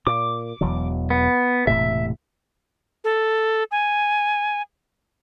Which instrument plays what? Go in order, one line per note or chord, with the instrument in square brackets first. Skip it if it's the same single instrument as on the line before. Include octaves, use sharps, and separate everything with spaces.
[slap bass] A#2 [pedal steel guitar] D6
[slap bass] E1 E2 F#3
[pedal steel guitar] B3
[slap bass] E1 A2 C3 [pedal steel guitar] E5
[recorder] A4
G#5